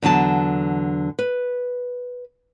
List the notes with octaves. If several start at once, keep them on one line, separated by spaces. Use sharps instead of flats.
E2 D3 F#3 A5
B4